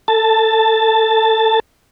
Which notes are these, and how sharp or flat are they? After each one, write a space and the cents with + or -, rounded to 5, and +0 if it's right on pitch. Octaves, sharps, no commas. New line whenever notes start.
A4 +20 A5 +0